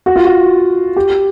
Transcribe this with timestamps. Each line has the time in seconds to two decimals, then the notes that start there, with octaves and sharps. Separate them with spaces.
0.06 F#4
0.16 F4
0.25 F#4
0.96 G4